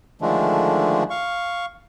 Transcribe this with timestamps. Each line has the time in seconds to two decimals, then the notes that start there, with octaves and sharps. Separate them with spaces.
0.22 D3 D#3 F3 G#3 A3 D4
1.10 F5 C#6